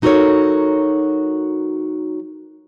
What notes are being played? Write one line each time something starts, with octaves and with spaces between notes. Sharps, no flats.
F#3 D#4 F#4 A4 A#4 C#5